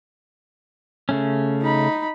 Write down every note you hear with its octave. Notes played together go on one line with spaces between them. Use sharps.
C#3 A3 C#4
D#4 B5